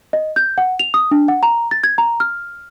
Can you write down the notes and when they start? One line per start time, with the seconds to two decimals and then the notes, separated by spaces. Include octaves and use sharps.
0.13 D#5
0.36 G6
0.58 F#5
0.79 F7
0.94 D#6
1.11 D4
1.28 F#5
1.43 A#5
1.71 A6
1.84 G#6
1.98 A#5
2.20 F6